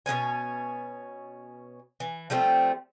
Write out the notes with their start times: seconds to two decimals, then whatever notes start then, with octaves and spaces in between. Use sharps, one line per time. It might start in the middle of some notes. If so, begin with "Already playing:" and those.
0.06 B2 G#3 C#4 G#5
2.00 E3
2.30 F3 G3 A3 C4